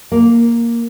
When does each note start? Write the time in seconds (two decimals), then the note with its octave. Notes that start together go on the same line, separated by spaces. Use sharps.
0.12 A#3